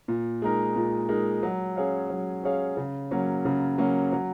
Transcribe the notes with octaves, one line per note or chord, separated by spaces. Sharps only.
A#2
G#3 D#4 A#4
A#2
G#3 D#4 A#4
F#3
C#4 G#4 C#5 F5
F#3
C#4 G#4 C#5 F5
C#3
F#3 A#3 C#4
C#3
F#3 A#3 C#4
F#3